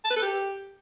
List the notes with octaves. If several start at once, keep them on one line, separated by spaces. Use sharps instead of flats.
A5
B4
A4
G4